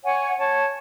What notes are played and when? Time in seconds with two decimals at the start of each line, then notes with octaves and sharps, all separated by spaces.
0.04 C#5 F#5 G#5
0.40 C#5 A5